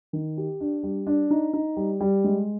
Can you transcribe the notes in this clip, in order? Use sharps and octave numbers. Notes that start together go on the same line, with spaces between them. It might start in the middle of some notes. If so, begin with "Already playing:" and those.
D#3
G4
D4
G3
D4
D#4
D#4
G3
G3
G#3